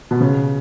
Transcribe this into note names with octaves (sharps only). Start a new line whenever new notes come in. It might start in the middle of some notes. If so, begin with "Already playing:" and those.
B2
C#3